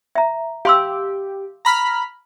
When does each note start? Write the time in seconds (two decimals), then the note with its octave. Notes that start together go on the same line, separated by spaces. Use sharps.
0.15 E5 A#5
0.65 G4 F5 C6 E6
1.65 A#5 B5 F6